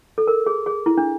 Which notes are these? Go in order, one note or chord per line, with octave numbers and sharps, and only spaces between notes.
A4
A#4
G#4
G#4
E4
D4